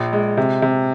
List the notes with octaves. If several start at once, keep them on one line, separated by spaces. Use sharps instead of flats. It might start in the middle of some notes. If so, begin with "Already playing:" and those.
Already playing: A#1
G#3
C3
C3